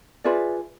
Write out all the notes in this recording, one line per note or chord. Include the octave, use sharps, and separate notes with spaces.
F4 G#4 B4 D5 E5